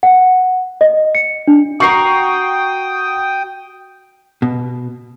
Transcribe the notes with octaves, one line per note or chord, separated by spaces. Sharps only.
F#5
D#5
C#7
D4
F#4 A#4 G5 C#6 D#6 C7
B2